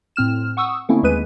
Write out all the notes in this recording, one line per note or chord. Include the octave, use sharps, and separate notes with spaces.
A2 C4 F6 E7
F#5 C#6 D#6 E6
D3 A3 A#3 C4 C#4 E4
D#2 G#3 G#4 B4 D#7